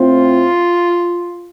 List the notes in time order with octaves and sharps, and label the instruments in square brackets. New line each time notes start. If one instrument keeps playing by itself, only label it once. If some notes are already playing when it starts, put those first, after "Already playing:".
Already playing: [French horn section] A2 A3 C4 F4